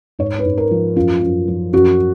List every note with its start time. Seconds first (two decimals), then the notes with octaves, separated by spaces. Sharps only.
0.19 G#2 C#5
0.39 B4
0.45 G#2
0.57 A#4
0.71 F3
0.96 F#2 F4
1.22 F#2
1.48 F3
1.73 F#2 F#4